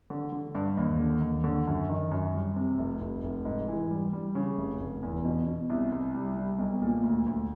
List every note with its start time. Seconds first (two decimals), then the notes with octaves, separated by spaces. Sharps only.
0.10 D3
0.32 D3
0.55 G2
0.77 D#2
1.00 D3
1.21 D#2
1.44 D3
1.67 F#2
1.89 D#3
2.11 F#2
2.34 G3
2.56 C3
2.78 F1
3.01 F1
3.24 F1
3.45 G#2
3.68 E3
3.91 G3
4.13 G3
4.35 C#3
4.57 F1
4.80 F1
5.03 E2
5.25 B2
5.47 B2
5.70 C2
5.92 C2
6.14 G3
6.37 G3
6.59 B1
6.82 A#2
7.04 D2
7.26 D2